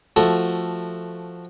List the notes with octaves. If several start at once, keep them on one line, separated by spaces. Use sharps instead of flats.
F3 A3 F#4 A4